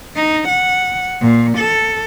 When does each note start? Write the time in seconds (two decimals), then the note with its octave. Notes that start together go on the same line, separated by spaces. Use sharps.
0.16 D#4
0.48 F#5
1.21 A#2
1.58 A4